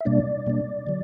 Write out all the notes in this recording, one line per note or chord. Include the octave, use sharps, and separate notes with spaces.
E5
B2 G3 A#3 D4 D5
B2 G3 A#3 D4
D3 F#3